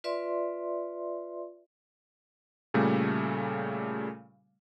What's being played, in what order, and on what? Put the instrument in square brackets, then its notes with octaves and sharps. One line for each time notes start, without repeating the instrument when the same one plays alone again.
[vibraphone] F4 B4 D5 E5 C6
[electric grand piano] A#2 C#3 G3 A3